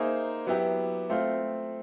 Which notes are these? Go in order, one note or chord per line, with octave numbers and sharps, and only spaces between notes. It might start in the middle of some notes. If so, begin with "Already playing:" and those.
Already playing: A#3 D#4 G#4 C5 E5
F#3 B3 E4 G4
A3 C4 F4